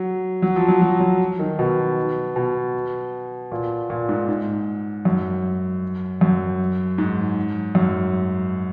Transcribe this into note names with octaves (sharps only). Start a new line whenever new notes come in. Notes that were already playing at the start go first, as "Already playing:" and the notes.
Already playing: F#3
F#3
F3
F#3
F#3
F#3
D#3
B2
B2
A#2
A#2
G#2
G#2
F#2
F#2
G#2
F#2